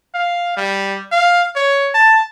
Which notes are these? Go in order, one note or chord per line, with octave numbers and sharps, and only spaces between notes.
F5
G3
F5
C#5
A5